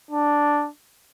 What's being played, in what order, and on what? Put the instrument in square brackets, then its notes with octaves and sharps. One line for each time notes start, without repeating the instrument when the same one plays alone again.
[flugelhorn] D4